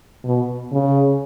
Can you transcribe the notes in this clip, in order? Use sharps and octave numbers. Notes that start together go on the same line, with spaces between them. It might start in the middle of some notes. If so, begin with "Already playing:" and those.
B2
C#3